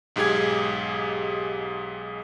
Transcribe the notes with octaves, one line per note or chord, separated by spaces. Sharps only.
B1 G#2 G4 G#4 G#6